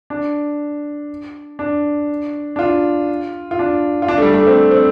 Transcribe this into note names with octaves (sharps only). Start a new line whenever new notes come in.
D4
D4
D4
F4
F4
D4
F4
D4
A3
G3
A3
C4
C4